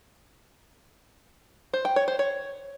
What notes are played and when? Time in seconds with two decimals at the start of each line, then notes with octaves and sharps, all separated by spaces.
1.74 C5
1.85 G5
1.96 C#5
2.08 C5
2.19 C#5